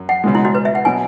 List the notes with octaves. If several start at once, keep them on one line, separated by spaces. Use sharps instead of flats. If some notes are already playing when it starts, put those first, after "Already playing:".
Already playing: F#2
F#5
C#2 B2 G#3
E4
F#4
B4
E5
F#5
B2 F#3 G#5